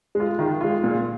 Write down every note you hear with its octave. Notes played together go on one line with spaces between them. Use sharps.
G#3 F4
D#3
G#3 F4
A#2